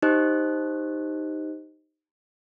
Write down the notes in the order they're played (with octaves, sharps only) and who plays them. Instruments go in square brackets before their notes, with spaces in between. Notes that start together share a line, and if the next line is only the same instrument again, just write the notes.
[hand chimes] D#4 G4 C5 D#5 F#6